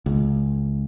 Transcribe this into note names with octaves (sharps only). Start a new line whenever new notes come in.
C#2